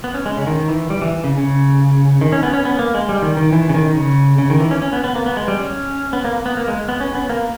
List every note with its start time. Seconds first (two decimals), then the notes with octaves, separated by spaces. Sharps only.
0.04 B3
0.14 C#4
0.26 G#3
0.37 C#3
0.47 D#3
0.68 E3
0.90 G3
1.01 E3
1.24 C#3
1.38 C#3
2.21 D#3
2.33 C#4
2.43 B3
2.53 C#4
2.65 B3
2.79 A#3
2.94 G#3
3.09 G3
3.22 D#3
3.37 D#3
3.52 E3
3.69 C#3
3.74 D#3
3.95 C#3
4.39 C#3
4.50 D#3
4.60 E3
4.71 C#4
4.82 C#4
4.93 B3
5.04 B3
5.15 A#3
5.26 B3
5.37 G#3
5.48 G3
5.58 C#4
6.13 B3
6.24 A#3
6.35 A#3
6.46 B3
6.57 A#3
6.68 G#3
6.89 B3
7.00 C#4
7.15 B3
7.29 A#3